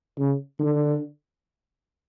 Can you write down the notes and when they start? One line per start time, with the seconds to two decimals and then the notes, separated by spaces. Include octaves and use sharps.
0.19 C#3
0.60 D3